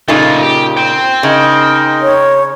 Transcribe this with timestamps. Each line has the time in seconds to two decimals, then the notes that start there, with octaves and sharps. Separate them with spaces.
0.08 A#2 C#3 A3 D#4 F4
0.43 G4
0.77 G5 C6
1.23 C#3 D#4 A#4 D#5
2.02 C#5